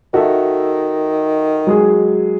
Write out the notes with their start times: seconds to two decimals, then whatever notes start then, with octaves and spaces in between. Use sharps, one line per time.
0.14 D#3 F#4 A4 E5
1.67 F#3 G#3 G#4